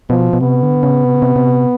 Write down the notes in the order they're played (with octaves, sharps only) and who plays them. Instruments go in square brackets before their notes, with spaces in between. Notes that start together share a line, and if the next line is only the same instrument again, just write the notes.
[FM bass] B2 [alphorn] F3
[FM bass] B2
[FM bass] C3 [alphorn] B3
[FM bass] D3
C#3
C3
C#3
C3
C3